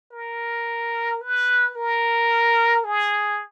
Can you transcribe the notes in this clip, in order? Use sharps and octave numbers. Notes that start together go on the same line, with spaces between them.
A#4
B4
A#4
G#4